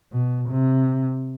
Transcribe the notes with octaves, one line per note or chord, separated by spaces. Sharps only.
B2
C3